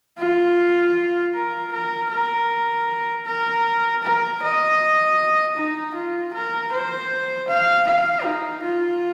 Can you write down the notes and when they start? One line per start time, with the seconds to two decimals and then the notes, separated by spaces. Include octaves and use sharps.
0.19 F4
1.35 A#4
1.73 A#4
2.11 A#4
3.26 A#4
4.03 A#4
4.42 D#5
5.57 D#4
5.95 F4
6.34 A#4
6.73 C5
7.48 F5
7.88 F5
8.25 D#4
8.64 F4